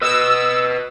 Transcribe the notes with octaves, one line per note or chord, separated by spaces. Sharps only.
B4 D#5 E6